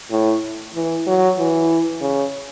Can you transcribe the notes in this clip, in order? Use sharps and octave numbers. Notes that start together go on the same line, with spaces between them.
A2
E3
F#3
E3
C#3